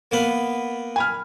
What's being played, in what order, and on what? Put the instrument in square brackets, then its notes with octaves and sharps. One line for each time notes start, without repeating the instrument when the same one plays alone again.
[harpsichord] A#3 B3 B4
[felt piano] G#5 B5 F6